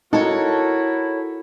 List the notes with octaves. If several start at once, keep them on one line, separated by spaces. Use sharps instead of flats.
D#4 E4 F#4 A4 A#4 C#5